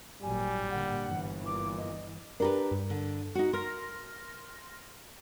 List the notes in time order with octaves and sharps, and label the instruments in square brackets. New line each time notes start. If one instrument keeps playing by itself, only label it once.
[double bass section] G#1 A#2 F#3 [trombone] G3 [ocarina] G#5
[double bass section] A#2 D3 [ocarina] F#5
[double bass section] G1 E3
[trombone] A#2 [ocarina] D6
[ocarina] D#5
[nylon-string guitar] D4 G4 B4 [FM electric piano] A#4 A#5
[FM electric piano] G2
[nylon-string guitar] D3
D#4 F#4
[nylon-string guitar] A#4 [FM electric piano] C6 F6 A#6